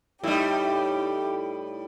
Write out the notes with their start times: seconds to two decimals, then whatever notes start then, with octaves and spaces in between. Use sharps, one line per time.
0.24 A2 G3 D#4 E4 G4